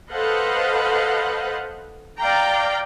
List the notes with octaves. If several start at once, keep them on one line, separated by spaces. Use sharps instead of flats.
A4 B4 C5 D#5 F5 F#5
D5 F5 G5 A#5